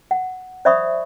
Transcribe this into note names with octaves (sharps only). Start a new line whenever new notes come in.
F#5
C5 D5 E5 B5 C#6 D#6